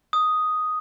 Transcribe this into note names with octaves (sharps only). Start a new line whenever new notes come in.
D#6